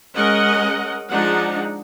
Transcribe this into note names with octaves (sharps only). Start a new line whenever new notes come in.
G#3 C#4 A#4 D#5 F#5
F3 G#3 D4 D#4 F#5